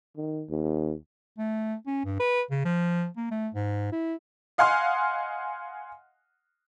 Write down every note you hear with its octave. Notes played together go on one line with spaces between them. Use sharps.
D#3
D#2
A3
C#4
G2
B4
C#3
F3
A#3
A3
G#2
E4
D#5 F5 F#5 G#5 C6 F6